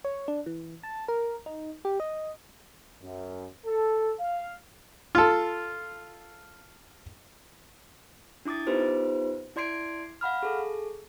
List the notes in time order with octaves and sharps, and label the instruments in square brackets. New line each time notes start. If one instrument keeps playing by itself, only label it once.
[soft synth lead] C#5
D4
E3
A5
A#4
D#4
G4
D#5
[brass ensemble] F#2
A4
F5
[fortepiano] F4 A4
[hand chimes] D4 E4 D6 D#6 A6
B3 D#4 F4 G4 B4 C5
E4 D5 C6 G#6 C7 D7
F5 F#5 B5 F6
G#4 A4